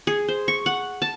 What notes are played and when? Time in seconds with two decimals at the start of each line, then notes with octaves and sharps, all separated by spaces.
0.07 G#4
0.28 C5
0.48 C#6
0.66 F#5
1.02 A5